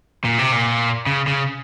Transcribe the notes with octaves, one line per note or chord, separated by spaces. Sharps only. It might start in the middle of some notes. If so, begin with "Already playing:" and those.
A#2
C3
A#2
C#3
C#3